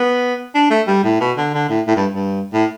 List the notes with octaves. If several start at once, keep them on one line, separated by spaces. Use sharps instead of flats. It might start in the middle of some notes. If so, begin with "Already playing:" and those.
Already playing: B3
D4
A3
G3
A2
B2
D3
D3
A2
A2
G2
G2
A2